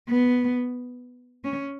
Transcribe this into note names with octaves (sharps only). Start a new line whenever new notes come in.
B3
C#4